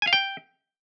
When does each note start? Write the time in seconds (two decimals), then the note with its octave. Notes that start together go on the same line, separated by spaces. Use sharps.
0.02 G#5
0.07 F5
0.13 G5